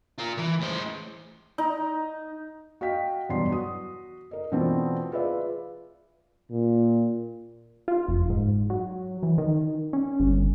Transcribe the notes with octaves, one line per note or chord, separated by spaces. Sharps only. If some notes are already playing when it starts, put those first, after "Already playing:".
F4 A#4
E3
A2 C5
D#4
F#4 D#5 F5 G5 B6
E2 G2 B2 F#3 C6 C7
F#4 D#6
A#4 D#5
B2 E3 A3 C4 D4 F4
F4 G#4 B4 D5 E5 F5
A#2
F4
F1
G#2
F#3
E3
D#3
C#4
G1